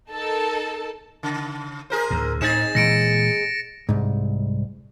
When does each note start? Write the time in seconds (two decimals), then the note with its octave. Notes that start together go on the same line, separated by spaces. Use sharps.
0.10 D#4 A4 A#4 A5
1.23 C#3
1.90 G#4 A#4 C5
2.11 D2 A2
2.41 A2 C4 D#4 G#4 A6 E7
2.75 A#2 E3 G#3 A#6 C#7 D7
3.89 C2 G#2